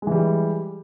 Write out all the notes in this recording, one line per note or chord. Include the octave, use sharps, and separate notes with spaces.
E3 G3 G#3